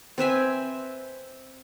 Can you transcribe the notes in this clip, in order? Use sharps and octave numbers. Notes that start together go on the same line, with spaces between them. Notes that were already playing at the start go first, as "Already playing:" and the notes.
C4 B4 E5 G#5